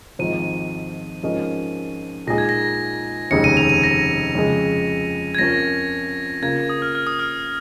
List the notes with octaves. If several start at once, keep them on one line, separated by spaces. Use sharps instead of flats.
G#1 G#2 F3 D#7
G#2 F3 C#4 A#4 D#5
A#2 G#3 D#4 G#4 A#6
G#6
A#6
F1 D#2 C#3 G#3 D#4 C#7
D#7
F7
D#7
A#6
F2 C#3 G#3
G#6
F2 F3 C#4 A#4 A#6
C#3 A#3 F4 A#4 G#6
D#6
F6
F6
D#6
F6